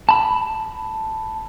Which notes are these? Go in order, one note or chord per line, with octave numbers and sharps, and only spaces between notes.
A5 B5